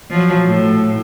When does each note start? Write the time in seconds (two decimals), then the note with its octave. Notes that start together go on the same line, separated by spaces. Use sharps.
0.10 F3 F#3
0.46 A2